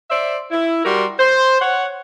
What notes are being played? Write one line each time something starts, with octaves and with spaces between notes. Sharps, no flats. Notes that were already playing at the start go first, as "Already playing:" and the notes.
C5 D5 E5
E4
G3 F#4 A#4 C6
C5
C#5 F#5